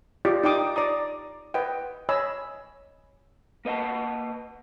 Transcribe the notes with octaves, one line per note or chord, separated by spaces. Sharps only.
F4 G4 D5 D#5
D#4 D5 G5 D6 D#6
D5 A#5 D#6
B4 D#5 F#5 G5
C#5 D#5 G#5 B5 E6
A#3 B4 D#5 F#5 A5